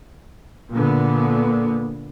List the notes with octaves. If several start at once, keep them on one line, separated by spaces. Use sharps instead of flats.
A#2 D3 A#3 B3